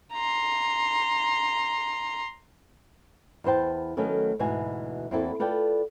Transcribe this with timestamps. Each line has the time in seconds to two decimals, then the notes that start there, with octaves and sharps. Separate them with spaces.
0.13 A#5 C6
3.44 E2 B3 C5 G5 A5
3.97 D#3 F#3 A3 B3 C#4 A4
4.39 D2 G#2 B2 E3 F#4 G#5
5.11 E2 A#3 C4 E4 F#4 A4
5.40 F4 A4 B4 D5 G5